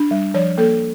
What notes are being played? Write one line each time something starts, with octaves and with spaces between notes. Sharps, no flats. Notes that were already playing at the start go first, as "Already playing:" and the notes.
Already playing: D4
G3
F3 C#5
A#3 A4